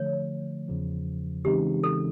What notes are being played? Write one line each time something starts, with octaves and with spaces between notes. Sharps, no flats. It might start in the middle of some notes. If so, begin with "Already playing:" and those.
Already playing: D3 F3 A3 C#5
E2 C#3 F3
C#3 E3 G#3 C4 D#4 G4
A4